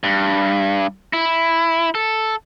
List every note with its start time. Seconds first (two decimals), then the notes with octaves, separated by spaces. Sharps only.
0.04 G2
1.13 E4
1.95 A4